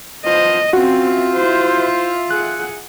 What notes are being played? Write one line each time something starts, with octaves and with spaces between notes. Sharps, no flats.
F3 B3 C5 D#5
C4 C#4 F4 F#4 E5
E4 C5
G#4 F#5 F#6